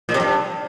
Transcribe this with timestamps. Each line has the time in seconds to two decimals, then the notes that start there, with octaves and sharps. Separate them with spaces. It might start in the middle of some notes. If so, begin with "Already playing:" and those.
0.09 A#2
0.14 C3
0.20 G2